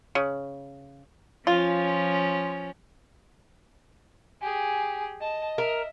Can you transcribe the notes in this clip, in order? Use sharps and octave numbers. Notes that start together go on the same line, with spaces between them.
C#3
F3 C#4 F4
G4 G#4 G#5
D#5 A5
A#4 E5